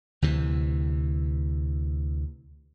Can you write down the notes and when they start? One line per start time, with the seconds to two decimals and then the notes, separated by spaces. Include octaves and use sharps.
0.22 D2 C3 E3